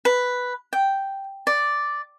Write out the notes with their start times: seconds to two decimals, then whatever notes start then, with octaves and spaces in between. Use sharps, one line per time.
0.05 B4
0.73 G5
1.47 D5